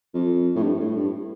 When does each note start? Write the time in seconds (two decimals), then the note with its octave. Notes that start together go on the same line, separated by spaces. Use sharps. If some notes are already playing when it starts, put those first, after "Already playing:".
0.14 F2
0.55 A2
0.63 G2
0.80 A2
0.96 G2